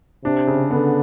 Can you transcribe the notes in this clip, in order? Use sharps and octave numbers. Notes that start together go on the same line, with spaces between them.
C3 D4
C#3
D3 B3